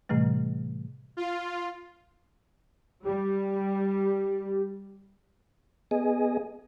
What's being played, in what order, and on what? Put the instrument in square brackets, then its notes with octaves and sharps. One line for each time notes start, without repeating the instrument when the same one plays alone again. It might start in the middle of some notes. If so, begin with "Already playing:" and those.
[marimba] A2 C3 E3 G3 A3
[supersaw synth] F4
[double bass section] G3 [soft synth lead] G4
[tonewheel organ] B3 G#4 D#5 G#5